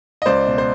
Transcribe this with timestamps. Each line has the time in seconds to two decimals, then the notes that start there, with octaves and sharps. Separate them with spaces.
0.22 D#5
0.26 C#2 C5 D5
0.47 B2
0.58 C5